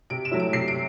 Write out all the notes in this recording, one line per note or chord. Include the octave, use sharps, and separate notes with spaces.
C3 D7
E7
F#3 A3 E4
D7
C3 C7
D7